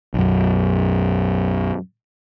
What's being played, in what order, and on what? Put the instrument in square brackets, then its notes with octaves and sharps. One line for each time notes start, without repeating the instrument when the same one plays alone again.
[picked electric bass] B1 F#2